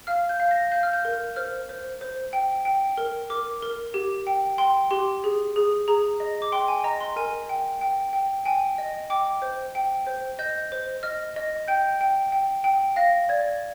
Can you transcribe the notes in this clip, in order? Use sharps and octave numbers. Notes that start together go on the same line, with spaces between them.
F5 F6
G6
F5
A#6
F5 G6
F6
G6
A#4
C5 F6
C5
C5
G5
G5
A#4
A#4 D6
A#4
G4
G5
G5 C6
G4 C6
G#4
G#4
G#4 A#5
D#5
D6
G5 C6
G#5
D#5 A#5
C6
A#4 G#5
G5
G5
G5
G5 G#5
D#5
G5 D6
C5
G5
C5
D#5 G6
C5
D#5 F6
D#5
G5 G6
G5
G5
G5
F5 A#6
D5 G#6